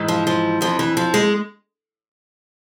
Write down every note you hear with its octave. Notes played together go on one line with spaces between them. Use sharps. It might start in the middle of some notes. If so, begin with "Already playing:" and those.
Already playing: G#2 E3
F3
F3
F2 E3 F3
E3
F3
G#3